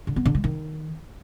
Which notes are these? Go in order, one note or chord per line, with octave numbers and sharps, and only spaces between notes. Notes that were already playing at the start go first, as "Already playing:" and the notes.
D3
B3
D3
G#3
D#3